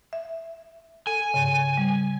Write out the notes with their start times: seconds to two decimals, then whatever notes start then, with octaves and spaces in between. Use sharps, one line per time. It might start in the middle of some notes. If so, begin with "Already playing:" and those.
0.13 E5
1.07 A4 G#5
1.34 G#2 C#3
1.77 G3